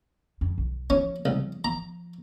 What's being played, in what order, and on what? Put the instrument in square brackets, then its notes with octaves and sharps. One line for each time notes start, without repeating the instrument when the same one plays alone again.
[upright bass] F2
B1
[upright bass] F3 [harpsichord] C#4
[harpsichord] C2
A#5